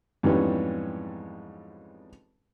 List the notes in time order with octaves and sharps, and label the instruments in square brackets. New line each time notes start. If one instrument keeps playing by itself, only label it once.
[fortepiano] F2 G#2 E3 G3 B3 C#4